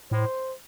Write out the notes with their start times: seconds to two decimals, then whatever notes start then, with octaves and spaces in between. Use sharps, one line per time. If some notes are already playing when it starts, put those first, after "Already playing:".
0.11 A2 C5